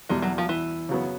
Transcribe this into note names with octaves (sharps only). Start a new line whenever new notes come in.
E2 B2 G3 G#3
F#3
F3
E3
C#3 F#3 B3